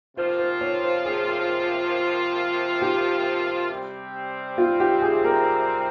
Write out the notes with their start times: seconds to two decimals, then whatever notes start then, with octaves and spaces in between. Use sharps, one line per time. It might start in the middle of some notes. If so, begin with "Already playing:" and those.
0.17 C3 F3 A#3 F4 C5
0.39 C5
0.61 C#5
0.82 C5
1.05 G#4
2.82 G4
3.69 C3 G3 C4
4.58 F4
4.80 G4
5.02 G#4
5.24 A#4